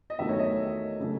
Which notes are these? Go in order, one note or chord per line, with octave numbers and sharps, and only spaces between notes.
D#5
E2 D#3 F#3 A3 E5
C#5
D#5
C#3 F#3 A3 C#4